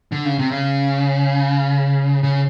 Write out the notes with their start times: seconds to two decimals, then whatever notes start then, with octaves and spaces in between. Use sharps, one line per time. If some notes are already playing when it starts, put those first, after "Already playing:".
0.12 D3
0.25 C#3
0.38 C3
0.51 C#3
2.23 C#3